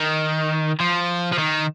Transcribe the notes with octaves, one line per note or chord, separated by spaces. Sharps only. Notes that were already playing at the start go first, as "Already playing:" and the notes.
Already playing: D#3
F3
F3
D#3